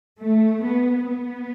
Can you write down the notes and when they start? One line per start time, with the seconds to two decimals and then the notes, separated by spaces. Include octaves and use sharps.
0.22 A3
0.65 B3
1.08 B3